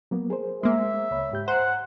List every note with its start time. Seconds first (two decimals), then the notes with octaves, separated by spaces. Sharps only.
0.11 F#3 A#3 B3
0.30 G#4 A#4 C5
0.63 G#3 A#3 E5
1.11 C#2 C#5 B5
1.32 G#2 G4 G6
1.48 C5 F#5 A#5 C6 F#6